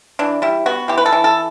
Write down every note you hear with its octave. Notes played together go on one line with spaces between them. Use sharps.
E3 D4
G3 E4
B3 F#4
E3 G4
B4
A4
E3
A4